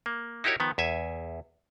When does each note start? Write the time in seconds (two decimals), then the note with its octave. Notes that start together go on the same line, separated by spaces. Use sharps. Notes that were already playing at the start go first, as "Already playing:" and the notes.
0.06 A#3
0.44 D#4 E4 F#4 G4 A#4 C#5
0.60 D#3 F3 B3
0.78 E2 E5 G#5